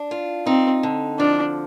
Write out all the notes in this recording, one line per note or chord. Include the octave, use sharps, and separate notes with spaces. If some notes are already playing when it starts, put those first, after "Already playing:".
Already playing: D4
F4
C4 D#4
D3
F3 D4